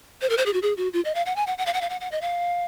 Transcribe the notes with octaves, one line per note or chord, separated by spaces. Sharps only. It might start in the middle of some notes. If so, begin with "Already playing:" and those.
C5
A#4
C5
G#4
F#4
G#4
F#4
F4
D#5
F5
F#5
G#5
F#5
F#5
F5
F#5
F5
F#5
F#5
D#5
F5